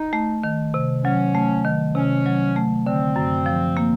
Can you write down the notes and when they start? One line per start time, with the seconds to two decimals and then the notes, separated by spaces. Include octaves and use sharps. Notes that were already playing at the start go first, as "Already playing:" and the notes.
Already playing: D#4
0.13 A3
0.44 D#3
0.74 C3
1.04 F#3 C#4
1.35 A3
1.64 D#3
1.95 C3 C#4
2.26 F#3
2.56 A3
2.85 D3 C4
3.16 F#2
3.46 F3
3.77 A#3